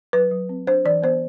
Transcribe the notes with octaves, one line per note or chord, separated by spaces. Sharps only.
F#3 B4
F#3
C4
D4 C5
E3 D5
B3 C5